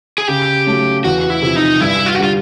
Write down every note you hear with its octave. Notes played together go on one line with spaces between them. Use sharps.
G#4
C#3 G4
F#3 A3 C#4
E2 F#4
E4
C3 F3
D#4
G2 E4
F4
F#4
D3 G3 F4